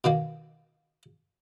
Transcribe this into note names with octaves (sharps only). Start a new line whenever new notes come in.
B2 D#3 A#3